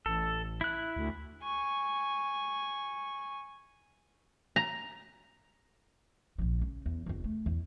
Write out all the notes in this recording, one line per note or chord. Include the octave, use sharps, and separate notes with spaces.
A1 A4
E4 F#6
D2
G#5 C#6
A#5
A#1 F3
C#3
E2
F1 E2
A3
E2